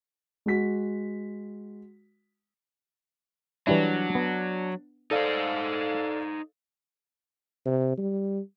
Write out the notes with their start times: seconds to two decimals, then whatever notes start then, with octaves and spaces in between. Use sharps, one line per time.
0.46 G#3 F#4 B6
3.67 E3 F#3 G3 D4 E4
4.15 B3
5.11 D#4 A4 C5 D5 F5
7.65 C3
7.98 G3